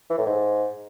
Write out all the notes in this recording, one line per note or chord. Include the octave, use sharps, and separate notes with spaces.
E3
A2
G#2